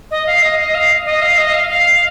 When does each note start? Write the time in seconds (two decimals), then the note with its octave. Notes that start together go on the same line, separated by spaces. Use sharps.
0.11 D#5
0.26 F5
0.42 D#5
0.58 D#5
0.74 F5
1.05 D#5
1.22 F5
1.37 D#5
1.53 F5
1.69 F5